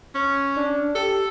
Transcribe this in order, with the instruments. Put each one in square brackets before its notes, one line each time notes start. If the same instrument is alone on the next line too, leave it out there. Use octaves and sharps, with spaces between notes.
[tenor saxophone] C#4
[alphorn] D4
[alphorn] G4 [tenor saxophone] A4